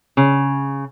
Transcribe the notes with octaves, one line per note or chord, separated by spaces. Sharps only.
C#3